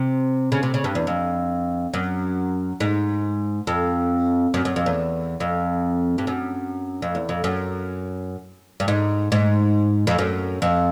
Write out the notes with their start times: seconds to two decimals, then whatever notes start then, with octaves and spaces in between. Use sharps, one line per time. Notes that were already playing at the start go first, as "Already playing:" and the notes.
Already playing: C3
0.52 C#3
0.63 C3
0.74 C#3
0.84 G2
0.95 E2
1.07 F2
1.94 F#2
2.80 G#2
3.67 F2
4.54 F#2
4.65 F#2
4.76 F2
4.86 E2
5.40 F2
6.18 G2
6.27 F#2
7.02 F2
7.15 E2
7.29 F2
7.44 F#2
8.80 G2
8.88 G#2
9.32 G#2
10.07 F2
10.19 F#2
10.62 F2